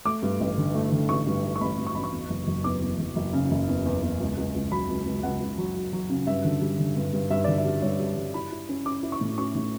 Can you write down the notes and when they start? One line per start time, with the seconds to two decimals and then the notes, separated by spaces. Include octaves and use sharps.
0.05 A3 D6
0.23 G2
0.40 A1
0.58 D3
0.74 A3
0.92 D3
1.09 A1 C#6
1.27 G2
1.43 A3
1.56 C#6
1.61 A1 B5
1.78 A1
1.87 C#6
1.95 A1 B5
2.03 C#6
2.12 E2
2.30 F#1
2.47 F#1
2.64 E2 D6
2.82 E2
2.99 F#1
3.16 F#1
3.33 C#3
3.51 F#1
3.68 E2
3.85 E2
4.02 E2
4.20 C#2
4.37 C#2
4.54 C#2
4.72 F#3 B5
4.89 C#2
5.06 C#2
5.23 C#2 F#5
5.40 C#2
5.58 F#3
5.75 F#3
5.93 F#3
6.10 C#3
6.27 G2 E5
6.44 D3
6.62 G3
6.79 D3
6.97 G2
7.13 G2
7.30 G2 E5
7.44 D3 D5
7.58 E5
7.65 G3
7.82 G2 C#5
7.99 G3
8.17 G3
8.34 E4 B5
8.52 E4
8.69 C#4
8.86 C#4 D6
9.03 E4
9.12 C#6
9.21 A2
9.38 C#4 C#6
9.55 A2